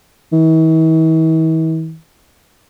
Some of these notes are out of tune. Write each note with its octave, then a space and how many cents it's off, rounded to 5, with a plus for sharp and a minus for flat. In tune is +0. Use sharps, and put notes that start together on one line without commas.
E3 -45